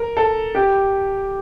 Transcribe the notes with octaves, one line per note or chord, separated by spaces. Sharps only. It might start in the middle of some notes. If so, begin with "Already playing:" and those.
Already playing: A#4
A4
G4